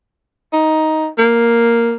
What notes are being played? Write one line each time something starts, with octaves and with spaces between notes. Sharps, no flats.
D#4
A#3